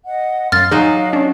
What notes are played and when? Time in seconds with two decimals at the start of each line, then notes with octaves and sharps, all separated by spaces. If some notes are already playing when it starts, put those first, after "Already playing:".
0.05 D#5 F#5
0.52 F#2 F5 C6 F6 A6
0.71 F#3 D#4 G#4 D#5 F5
1.13 C#4 D4